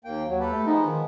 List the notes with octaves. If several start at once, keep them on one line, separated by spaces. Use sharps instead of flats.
D#2 A#3 G5
D#2 F#3
G4 A4 B4
A3
F3 G#3 B3 D#4
D#3